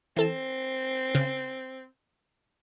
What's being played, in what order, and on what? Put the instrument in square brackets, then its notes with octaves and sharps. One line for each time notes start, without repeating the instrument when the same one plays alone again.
[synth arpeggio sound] E3 A4 E7 [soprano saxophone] C4
[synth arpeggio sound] C#3